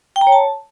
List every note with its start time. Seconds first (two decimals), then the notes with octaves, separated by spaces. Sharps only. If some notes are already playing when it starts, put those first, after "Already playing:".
0.16 G5
0.21 A#5
0.27 C#5
0.32 A5